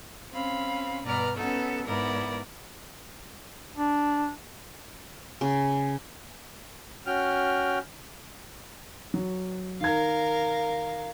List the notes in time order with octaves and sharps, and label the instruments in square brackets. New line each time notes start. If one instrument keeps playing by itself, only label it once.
[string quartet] C4 C#4 F5 B5
G2 B2 B4 D5 A#5 F6
B3 C#4 D#4 F#4 A4
G#2 B3 E4 A#4 D5 A#6
[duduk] D4
[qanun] C#3
[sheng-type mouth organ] C#4 F#4 G5 F6
[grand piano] F#3
[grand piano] D#3 G#6 [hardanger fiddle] A#4 F5